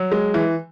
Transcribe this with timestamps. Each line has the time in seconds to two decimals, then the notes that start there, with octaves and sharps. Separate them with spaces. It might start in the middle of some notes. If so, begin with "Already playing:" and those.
Already playing: F#3
0.12 G#3
0.34 E3